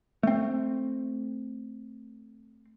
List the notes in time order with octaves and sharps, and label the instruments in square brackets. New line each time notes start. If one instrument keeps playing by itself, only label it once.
[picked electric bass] A3 C4